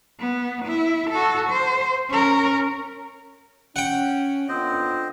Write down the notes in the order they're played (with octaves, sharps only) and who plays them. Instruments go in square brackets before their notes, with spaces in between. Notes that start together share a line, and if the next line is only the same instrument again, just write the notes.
[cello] B3
E4
F#4 A4
C5
C#4 A#4
[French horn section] C#4 [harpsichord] F#5 G5
[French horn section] D3 B3 F4 [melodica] C4 C5 D#5